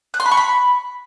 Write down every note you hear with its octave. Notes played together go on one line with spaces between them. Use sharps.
F#6
C6
B5
C#6
B5